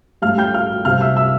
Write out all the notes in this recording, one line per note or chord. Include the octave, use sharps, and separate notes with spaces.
A1 A2 G3 F5 F6
G5 G6
F5 F6
C2 C3 G3 C4 F5 F6
E5 E6
E5 E6